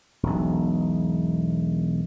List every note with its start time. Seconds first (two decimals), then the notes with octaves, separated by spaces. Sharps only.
0.23 E1 B1